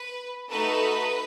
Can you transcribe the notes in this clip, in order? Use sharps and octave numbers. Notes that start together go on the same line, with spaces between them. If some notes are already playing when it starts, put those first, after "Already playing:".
Already playing: B4
A3 D#4 F#4 A4 B4